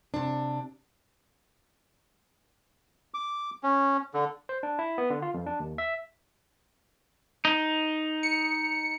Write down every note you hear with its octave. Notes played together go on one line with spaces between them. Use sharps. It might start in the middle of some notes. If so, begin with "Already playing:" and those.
C3 D4
D6
C#4
D3
C5
D4
E4
B3
D3
F4
F2
D4
D#2
E5
D#4
C#7